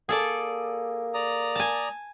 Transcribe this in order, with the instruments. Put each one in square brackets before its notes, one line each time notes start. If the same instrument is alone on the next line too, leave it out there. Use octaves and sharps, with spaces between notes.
[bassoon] A#3 [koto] G#4 A4 D5
[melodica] D5 A#5 D#6
[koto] G#5 A5